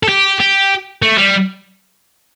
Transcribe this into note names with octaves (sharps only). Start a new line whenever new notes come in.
A4
G4
G4
A3
G3